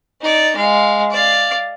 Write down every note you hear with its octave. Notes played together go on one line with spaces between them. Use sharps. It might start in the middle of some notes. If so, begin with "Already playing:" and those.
D#4 D5
G#3 F5
D5 F5